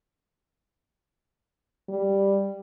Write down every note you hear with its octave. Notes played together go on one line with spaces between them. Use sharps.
G3